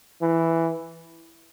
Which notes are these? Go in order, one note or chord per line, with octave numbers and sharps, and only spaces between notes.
E3